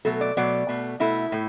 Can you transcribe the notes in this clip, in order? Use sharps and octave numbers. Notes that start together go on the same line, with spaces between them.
B2 F#3 A3 A4
D5
B2 F#3 A3 D5
B2 A3
B2 A3 E4
A2 A3